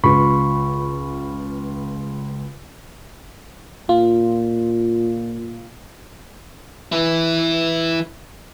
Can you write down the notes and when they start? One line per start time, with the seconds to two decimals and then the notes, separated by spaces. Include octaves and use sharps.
0.04 C#2 F4 B4 B5 C#6
3.89 A#2 F4
6.92 E3 E4